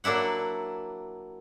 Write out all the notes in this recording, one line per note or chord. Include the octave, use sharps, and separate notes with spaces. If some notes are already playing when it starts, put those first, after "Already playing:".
F#3 A#3 D4 E4 F#5